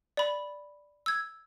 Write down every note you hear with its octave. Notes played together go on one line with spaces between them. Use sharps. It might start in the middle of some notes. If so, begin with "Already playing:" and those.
D5 B5
E6 G#6